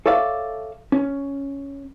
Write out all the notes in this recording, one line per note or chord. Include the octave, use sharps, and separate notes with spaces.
A4 C#5 D5 E5 F5
C#4